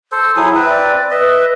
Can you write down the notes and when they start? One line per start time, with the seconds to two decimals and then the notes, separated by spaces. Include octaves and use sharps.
0.12 A4 C5
0.36 F#3 E4 G#4 D#6
0.55 C4 B4 E5
0.69 D5
1.11 B4 D#5 E5